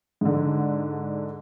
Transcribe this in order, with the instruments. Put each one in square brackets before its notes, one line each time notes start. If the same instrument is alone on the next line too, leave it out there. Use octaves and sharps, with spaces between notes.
[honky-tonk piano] G#2 D3